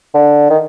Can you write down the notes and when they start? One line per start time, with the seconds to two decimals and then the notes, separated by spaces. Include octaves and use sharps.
0.14 D3
0.50 D#3